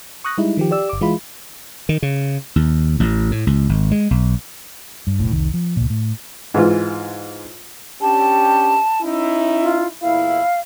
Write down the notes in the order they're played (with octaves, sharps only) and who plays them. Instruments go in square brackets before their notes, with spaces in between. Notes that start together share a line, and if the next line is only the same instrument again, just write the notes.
[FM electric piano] C#6 D#6 F#6 A#6
G3 G#3 D#4 E4
D#3 F3 G4
G4 D5 E6
G1 D6
E3 G#3 E4 F4 B5
[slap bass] D#3
C#3
D#2
A1
A2
C#2
G#1
G#3
B1
[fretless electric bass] G2
F1 B1 A2
F1 C2 D#3
F3
C#2 A#2
A2
[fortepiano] G#2 E3 F4
[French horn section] C#4 D4 G4 [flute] A5
[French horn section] C#4 D#4 E4
[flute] F4
[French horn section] E2 A#2 E4 [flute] F5